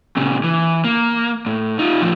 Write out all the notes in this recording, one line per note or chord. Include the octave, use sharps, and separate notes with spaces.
A#2 C#3
E3
A#3
A2
D#4 F4
A2 F3